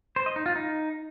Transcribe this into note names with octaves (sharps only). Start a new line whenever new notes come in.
C5
D#5
D#4
F4
D#4